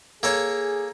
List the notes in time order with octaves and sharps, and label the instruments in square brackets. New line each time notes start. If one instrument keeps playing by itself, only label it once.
[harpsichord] A#3 A4 C#5 [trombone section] G#4